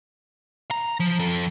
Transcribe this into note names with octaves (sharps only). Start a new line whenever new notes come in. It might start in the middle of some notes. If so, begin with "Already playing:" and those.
A#5
F3
F3 A4